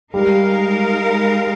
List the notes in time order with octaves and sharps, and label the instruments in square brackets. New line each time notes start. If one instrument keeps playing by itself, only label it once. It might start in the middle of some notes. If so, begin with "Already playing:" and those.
[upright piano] G3 [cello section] G#3 D#4 A#4 F5